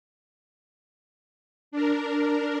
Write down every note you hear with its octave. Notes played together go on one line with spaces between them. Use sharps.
D4 A#4